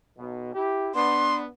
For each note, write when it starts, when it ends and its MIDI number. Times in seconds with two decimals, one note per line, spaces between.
0.18 0.53 35
0.18 0.53 47
0.55 0.90 64
0.55 0.90 67
0.95 1.45 59
0.95 1.45 62
0.95 1.35 84